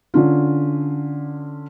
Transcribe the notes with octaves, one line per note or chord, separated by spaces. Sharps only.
D3 C#4 F4